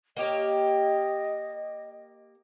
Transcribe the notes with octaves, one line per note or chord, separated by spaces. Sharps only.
A#3 G4 C#5 D#5